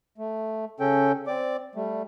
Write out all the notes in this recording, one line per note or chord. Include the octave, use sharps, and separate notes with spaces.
A3
C#3 C#4 A4 G5
C4 D5 D6
G3 A3